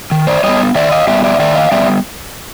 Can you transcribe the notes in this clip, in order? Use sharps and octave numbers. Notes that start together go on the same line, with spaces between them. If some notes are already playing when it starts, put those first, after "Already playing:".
D#3
C5 D5
G3 B3 C#5 D#5
D#3 D5 E5
D#5 F5
G3 B3 D5 E5
D5 E5
D#3 D5 E5
D#5 F5
G3 B3 D5 E5